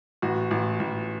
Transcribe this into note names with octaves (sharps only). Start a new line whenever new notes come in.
A1 F#4
A1
A1